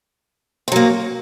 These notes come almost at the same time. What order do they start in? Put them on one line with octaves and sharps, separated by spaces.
C4 F#3 A#3